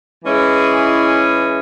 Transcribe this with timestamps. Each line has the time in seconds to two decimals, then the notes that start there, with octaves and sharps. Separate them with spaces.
0.25 E3 G#3 C#4 E4 G#4